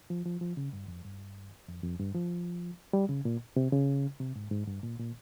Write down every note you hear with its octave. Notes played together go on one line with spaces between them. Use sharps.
F3
F3
F3
C#3
G2
F2
G2
F2
F2
G2
F3
G3
C#3
A#2
C3
C#3
C3
G#2
G#2
G2
A#2
A#2